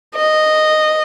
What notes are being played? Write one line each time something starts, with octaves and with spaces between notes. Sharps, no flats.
D#5